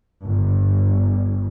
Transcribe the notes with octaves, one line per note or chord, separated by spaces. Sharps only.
G1